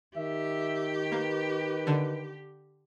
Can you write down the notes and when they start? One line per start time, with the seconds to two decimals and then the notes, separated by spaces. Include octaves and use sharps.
0.16 D#3 G4 E5
1.12 A#3 B4
1.87 D3